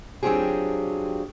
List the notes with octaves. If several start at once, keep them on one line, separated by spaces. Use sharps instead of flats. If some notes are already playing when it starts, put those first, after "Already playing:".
F#3 C4 D4 F4 G4 G#4